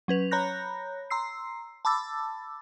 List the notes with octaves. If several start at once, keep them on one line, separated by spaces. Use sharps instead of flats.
F#3 C#4 B4 F7
C#5 A#5 B5 F#6 G6 A#6
A#5 C6 E6 C7
A5 B5 D6 E6 A6